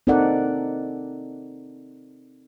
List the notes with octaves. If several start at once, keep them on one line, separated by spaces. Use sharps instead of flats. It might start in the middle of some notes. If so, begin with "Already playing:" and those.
C4 D#4 A4 A#4 D5 F#5